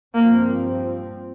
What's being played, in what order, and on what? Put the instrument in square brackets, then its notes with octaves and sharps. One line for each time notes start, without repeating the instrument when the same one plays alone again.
[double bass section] G2 F3 C4 [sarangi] A#3